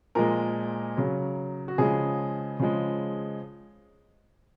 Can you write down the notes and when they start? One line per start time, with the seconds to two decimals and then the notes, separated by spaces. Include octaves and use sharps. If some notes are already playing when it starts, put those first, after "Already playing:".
0.15 A#2 F3 G#3 A#4
0.97 C#3 F#3
1.68 F#4
1.78 C#3 F3 G#3 G#4
2.60 C#3 F3 G#3